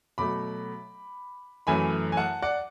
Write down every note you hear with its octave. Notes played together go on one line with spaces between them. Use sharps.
B2 F#3 A3 B5 D6
F#2 E3 A3 G#5 B5
G#5
F#5 A5
D5 F#5